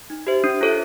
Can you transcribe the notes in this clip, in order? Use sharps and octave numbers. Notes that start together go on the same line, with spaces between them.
D#4
G4 C5 E5
D4
F4 A4 C#5 E5